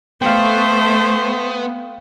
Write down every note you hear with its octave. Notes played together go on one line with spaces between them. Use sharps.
A3 B3 C5 F5 G5